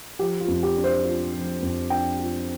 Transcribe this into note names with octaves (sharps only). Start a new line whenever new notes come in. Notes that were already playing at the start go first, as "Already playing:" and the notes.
F3 G4
F4
F2
G4
D4
C5
F4
F3
F2
D4 G5
F4